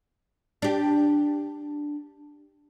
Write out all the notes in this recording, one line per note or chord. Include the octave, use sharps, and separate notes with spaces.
D4 G4